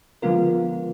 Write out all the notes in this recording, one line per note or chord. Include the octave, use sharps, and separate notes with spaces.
D3 F3 G#3 B3 F4 A#4